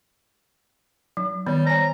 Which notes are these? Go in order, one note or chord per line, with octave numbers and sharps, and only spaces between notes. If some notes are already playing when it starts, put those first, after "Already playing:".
F#3
D#3 G3 B3 C#5
C5 C#5 G#5 A#5